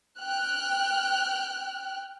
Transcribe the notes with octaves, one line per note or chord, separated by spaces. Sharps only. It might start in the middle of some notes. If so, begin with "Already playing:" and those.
G5 F6 F#6